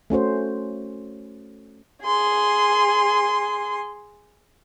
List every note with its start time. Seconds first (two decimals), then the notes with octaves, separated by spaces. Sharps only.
0.10 A3 C#4 F#4 C5
2.04 G#4 C6